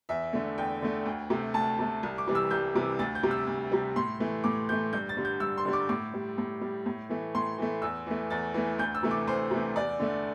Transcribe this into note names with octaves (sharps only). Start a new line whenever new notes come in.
E2 E5
D3 A3
E2 G5
D3 A3
D2
C3 A3
D2 A5
C3 A3
C2
D6
C3 E3 G3
E6
C2 G6
C3 E3 G3
D2 A6
G6
C3 G3
E6
D2
C3 G3
A2 C6
E3 A3
A2 D6
E3 A3 G6
G2 G6
A6
D3 G3
G6
G2 E6
C6
D3 G3
D6
A2 D6
G3
A2
G3
A2
E3 A3
A2 C6
E3 A3
E2 E6
E3 A3
E2 A6
E3 A3
D2 G6
E6
C3 E3 A3
D6
D2 C5
C3 E3 A3
E2 D5
D3 A3